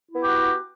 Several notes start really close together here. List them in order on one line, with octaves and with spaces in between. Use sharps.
E4 B3 G4 F#4